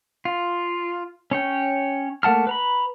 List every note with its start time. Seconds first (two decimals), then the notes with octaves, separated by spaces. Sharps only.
0.25 F4
1.31 C#4 C#5 G5
2.23 A3 A#3 F#5 A5 F6
2.47 B4 A#5 B5